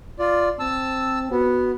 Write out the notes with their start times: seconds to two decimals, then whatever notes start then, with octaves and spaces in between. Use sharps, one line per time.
0.19 F4 D5
0.59 C4 A5 E6
1.31 B3 F#4